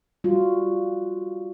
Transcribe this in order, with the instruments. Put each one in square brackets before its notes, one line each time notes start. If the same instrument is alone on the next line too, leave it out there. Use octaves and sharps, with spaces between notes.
[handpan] G3 F4 F#4